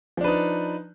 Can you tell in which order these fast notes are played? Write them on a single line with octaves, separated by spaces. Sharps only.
F3 D4 B4 D#4